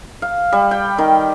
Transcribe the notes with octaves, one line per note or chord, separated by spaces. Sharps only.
F5
G3
G5
D#3